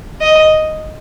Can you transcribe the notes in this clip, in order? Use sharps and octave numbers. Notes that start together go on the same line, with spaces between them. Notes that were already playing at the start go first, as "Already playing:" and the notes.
D#5